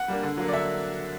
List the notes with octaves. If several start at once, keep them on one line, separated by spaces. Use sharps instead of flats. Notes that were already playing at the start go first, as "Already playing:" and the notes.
Already playing: F#5
G3 A#3 D4
D3
F#3 A#3
D5
D3 E5